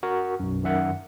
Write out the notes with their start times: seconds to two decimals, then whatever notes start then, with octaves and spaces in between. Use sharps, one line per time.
0.03 F#4 A#4
0.40 B1 F#2
0.63 F#2 D#3 E5 F#5